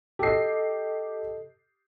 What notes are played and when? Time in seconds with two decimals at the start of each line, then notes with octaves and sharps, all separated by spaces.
0.19 G4 A4 D#5 C7